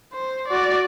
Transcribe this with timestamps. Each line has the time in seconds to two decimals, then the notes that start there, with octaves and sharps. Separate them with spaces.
0.14 C5
0.48 F#4 D5